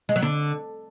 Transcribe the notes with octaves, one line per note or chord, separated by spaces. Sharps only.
G#3
F#3
D3